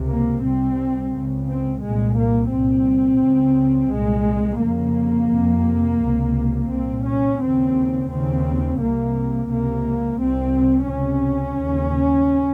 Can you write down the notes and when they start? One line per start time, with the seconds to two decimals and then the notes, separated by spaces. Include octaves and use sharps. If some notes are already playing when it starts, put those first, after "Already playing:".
Already playing: C#2 C3
0.08 A#3
0.43 C2 C3 C4
1.13 C#2 C#3
1.48 C4
1.82 C2 A#2 G#3
2.17 A#3
2.53 C2 A#2 C4
3.22 C#2 C#3
3.91 C2 A#2 G#3
4.62 F2 C#3 A#3
5.31 F2 C3
6.01 C#2 C3
6.71 C2 A#2 C4
7.05 C#4
7.40 D#2 C#3 C4
8.10 D#2 C#3 C4
8.80 C2 C3 A#3
9.50 C#2 C3 A#3
10.20 C2 C3 C4
10.88 C#2 C3 C#4
11.59 D#2 C#3